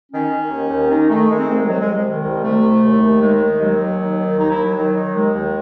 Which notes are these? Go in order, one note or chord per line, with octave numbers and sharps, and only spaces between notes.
D#3 C#4
D#3
D#2
D#2
D#3 D#4
D#3 A3
D#3 G#3
C4
C2 A3
G#3
C3 F#3
G#3
C2
G#3
D#3
C2
C3 A3
C2
D#2
D#2
D#3 G#3
D#3
D#2 F#3
D#2
D#3
D#3
D#2 D#4
E4
D#2
F#3
D#3
D#3
D#2 G#3
D#2